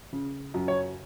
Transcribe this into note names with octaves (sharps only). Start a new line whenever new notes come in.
C#3
F#2
C#5